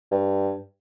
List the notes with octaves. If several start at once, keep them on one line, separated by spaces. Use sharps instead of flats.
G2